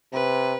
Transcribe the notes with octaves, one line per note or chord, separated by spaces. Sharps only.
C3 B4